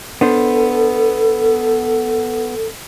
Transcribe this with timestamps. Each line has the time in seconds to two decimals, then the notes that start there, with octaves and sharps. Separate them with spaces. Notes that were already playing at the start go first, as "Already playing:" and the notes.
0.21 B3 D4 A4 C5